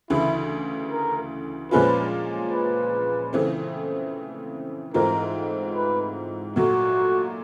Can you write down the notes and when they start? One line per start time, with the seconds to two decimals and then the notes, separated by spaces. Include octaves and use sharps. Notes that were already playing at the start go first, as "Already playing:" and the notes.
0.10 D2 C#3 E3 E4
0.91 A#4
1.71 A#2 F3 G#3 C#4 F4 B4
2.52 B4
3.33 C#3 E3 A3 C4
4.94 G#2 E3 A3 C4 F4 A#4
5.76 B4
6.56 A#2 F#3 A3 F#4